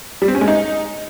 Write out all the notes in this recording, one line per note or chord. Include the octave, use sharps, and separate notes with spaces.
G3
C4
C#4
G#3
D#4